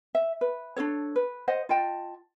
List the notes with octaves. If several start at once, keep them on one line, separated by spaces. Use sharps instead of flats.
E5
B4
D4 F4 A4 C#5
B4
C5 D#5 F#5
F4 D#5 G5 A5